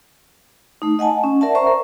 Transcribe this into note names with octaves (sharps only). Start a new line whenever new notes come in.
A3 D#4
D#5 F#5 G#5 A5
C#4
A#4 D5 E5 F#5 A5
C5 E5 A#5 C#6
A#4